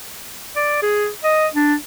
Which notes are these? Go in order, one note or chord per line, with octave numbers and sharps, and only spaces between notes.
D5
G#4
D#5
D4